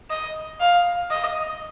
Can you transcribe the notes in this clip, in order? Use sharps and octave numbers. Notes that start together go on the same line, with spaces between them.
D#5
F5
D#5